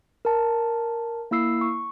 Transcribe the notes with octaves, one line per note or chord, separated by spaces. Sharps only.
A#4 A5
A#3 E4 E6 C7
C#6